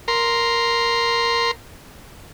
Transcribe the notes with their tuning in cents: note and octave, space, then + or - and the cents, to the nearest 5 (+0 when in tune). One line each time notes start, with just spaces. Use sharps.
A#4 +0 C6 +0